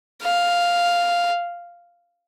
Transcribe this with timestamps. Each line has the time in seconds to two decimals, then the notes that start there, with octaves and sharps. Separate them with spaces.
0.23 F5